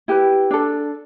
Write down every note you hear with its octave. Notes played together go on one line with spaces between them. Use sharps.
E4 G4 B4
D4 A4